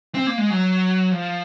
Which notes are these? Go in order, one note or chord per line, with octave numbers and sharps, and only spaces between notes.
C4
A#3
G#3
F#3
F3